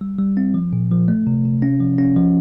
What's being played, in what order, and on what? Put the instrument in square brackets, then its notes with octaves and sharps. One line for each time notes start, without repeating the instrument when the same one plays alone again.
[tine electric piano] G3
G3
C4
F3
A#2
F3
A3
C3
C3
C#4
F3
C#4
F3